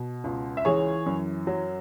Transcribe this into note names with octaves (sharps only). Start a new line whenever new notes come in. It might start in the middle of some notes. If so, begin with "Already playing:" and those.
Already playing: B2
C#2
E5
E3 G#4 C#5
F#2
F#3